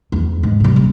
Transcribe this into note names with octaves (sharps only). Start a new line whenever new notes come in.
E2
G#2
C3 G3
D#1